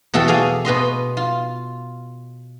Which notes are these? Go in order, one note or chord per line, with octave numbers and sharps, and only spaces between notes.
E2 B2 F#4 A4 G5 A5
G#4 D5 F5 G#5
B2 B4 D#5 C6
F4